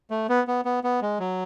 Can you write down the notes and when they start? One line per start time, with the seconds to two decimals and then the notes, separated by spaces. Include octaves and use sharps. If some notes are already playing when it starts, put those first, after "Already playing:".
0.10 A3
0.29 B3
0.47 B3
0.65 B3
0.84 B3
1.02 G#3
1.19 F#3